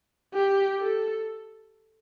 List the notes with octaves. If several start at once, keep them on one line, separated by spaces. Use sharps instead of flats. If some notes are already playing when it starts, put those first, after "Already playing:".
G4
A4